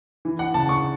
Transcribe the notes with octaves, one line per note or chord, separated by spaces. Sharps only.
E3
F#5
C#3 A5
C#6